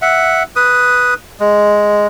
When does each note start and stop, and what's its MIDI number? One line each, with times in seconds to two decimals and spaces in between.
0.02 0.43 76
0.02 0.43 78
0.56 1.14 71
0.56 1.14 87
1.40 2.07 56